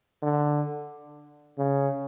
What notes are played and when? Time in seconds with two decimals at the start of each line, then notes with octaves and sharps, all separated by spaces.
0.23 D3
1.58 C#3